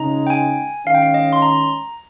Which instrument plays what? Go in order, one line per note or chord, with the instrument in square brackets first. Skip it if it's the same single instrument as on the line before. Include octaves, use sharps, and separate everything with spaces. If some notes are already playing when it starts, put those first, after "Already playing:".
Already playing: [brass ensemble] C#3 G#3 D#4 [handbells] A#5
[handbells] G5
G#5
[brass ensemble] D#3 G#3 C#4 [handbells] F5
[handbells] G5
F5
D#5
C6
A#5